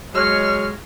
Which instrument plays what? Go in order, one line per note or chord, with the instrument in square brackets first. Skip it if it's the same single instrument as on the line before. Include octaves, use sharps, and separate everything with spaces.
[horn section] F#3 G#3 C#5 [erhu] F6